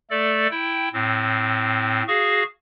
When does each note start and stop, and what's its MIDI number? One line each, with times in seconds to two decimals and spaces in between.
0.10 0.47 57
0.10 0.47 69
0.10 0.47 74
0.51 0.89 64
0.51 0.89 79
0.93 2.03 45
0.93 2.03 60
2.08 2.43 66
2.08 2.43 68
2.08 2.43 77
2.08 2.43 85